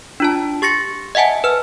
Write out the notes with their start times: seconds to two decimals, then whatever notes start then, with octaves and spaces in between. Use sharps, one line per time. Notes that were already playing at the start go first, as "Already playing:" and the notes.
0.20 D4 F4 A5
0.62 G4 C#6 A6 A#6 C#7
1.15 D#5 E5 F#5 G#5 A5
1.44 B4 F6